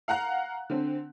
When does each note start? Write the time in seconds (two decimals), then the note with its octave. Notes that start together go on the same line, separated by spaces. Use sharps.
0.08 F5 F#5 A#5 F#6
0.70 D3 C4